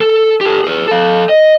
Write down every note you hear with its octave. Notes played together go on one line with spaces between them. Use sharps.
A4
G4 A4
G#4 B4
A4 F5
D#5